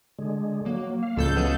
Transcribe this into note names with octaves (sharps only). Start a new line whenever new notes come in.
D3 G#3
F#3 A#3
F5
C#2 A2 F3 A4 G6
E3 F#3 B3 D#5 F5 F#5